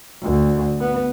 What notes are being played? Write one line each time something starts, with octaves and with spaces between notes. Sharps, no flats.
D2
B3